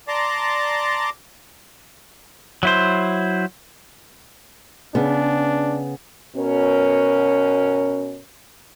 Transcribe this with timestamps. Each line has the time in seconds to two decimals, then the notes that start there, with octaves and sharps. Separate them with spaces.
0.08 D5 A5 A#5 C6 D6
2.63 F#3 E4 C5
4.95 C#3 B3 D4
6.36 B2 C#4 A#4